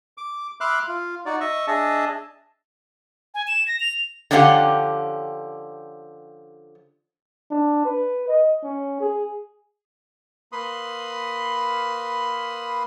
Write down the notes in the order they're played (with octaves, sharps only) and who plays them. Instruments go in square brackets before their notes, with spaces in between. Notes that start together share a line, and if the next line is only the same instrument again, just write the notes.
[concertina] D6
E5 B5 C6 D6 F6 F#6
F4
D#4 F#4 D5
D#5 E5 C#6
D4 G#4 D#5 E5 A5
[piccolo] G#5
E7
A#6
F7
[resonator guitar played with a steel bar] D3 F3 C#4 G4 F5 F#5
[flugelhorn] D4
B4
D#5
C#4
G#4
[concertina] A#3 B4 B5 C6 D#6